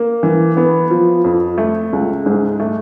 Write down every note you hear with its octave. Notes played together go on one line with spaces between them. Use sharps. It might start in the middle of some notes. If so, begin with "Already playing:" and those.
Already playing: A#3
E3
B3
F3
F2
A3
C#2
G#2
A3